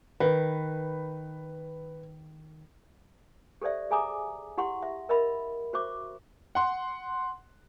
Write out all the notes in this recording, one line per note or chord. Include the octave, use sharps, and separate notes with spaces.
D#3 B4
G4 A4 C5 D5 E5
G#4 E5 G#5 A#5 D6 D#6
E4 G4 F#5 C6 C#6
E5
A#4 D#5 E5 B5
F#4 C5 E5 C#6 D6
F#5 C6